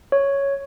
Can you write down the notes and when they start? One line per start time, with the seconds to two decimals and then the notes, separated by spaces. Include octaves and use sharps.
0.12 C#5